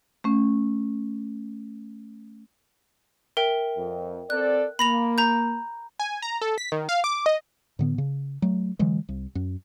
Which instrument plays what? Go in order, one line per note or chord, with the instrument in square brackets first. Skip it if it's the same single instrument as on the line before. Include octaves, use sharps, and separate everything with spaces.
[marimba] A3 C#4
[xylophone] A#4 E5 G5
[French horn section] F2
[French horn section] C4 A4 D5 [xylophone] F#6
[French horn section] A#3 [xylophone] B5 A#6 F7
[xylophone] A#5 G6
[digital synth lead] G#5
A#5
A4
B6
D#3
F5
D6
D#5
[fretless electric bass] A2 D3 B3
C#3
F#3 A3
D3 E3 F#3 G#3
C2
F#2